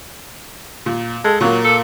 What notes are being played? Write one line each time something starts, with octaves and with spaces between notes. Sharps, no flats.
A#2
G#3 A4
A#2 F#3 A#3
A4